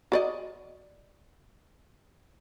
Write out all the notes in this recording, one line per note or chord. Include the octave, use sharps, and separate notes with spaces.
F#4 D5 D#5